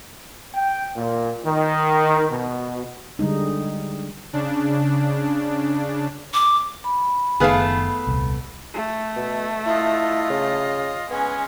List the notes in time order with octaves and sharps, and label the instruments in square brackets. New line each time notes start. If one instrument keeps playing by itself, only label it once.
[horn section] G5
A#2
D#3
B2
[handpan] D3 G3 G#3 D#4
[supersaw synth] C#3 D4
[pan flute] D6
[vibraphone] B5
[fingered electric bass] F#1 D#3 [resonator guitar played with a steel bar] A3 B3 [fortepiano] G#4 B4 F5
[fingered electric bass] D#1 C2
[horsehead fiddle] A3
[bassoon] B2
[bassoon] E4 [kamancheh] F4 D#5
[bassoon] C#3
[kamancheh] G#3 C#4 [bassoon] B3 [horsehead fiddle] G#5